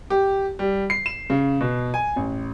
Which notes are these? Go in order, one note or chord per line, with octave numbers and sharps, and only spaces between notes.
G4
G3
C7
E7
C#3
B2
G#5
A1